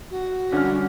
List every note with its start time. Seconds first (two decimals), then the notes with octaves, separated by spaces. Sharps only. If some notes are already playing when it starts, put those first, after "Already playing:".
0.11 F#4
0.53 D3 G3 C#4 F6